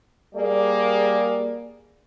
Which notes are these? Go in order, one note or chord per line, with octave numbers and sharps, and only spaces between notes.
G3 A#3 G#4 D5